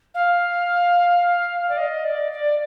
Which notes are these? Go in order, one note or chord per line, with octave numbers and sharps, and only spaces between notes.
F5
D5
D#5
D5
D5